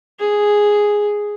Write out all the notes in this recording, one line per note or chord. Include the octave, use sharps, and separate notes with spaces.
G#4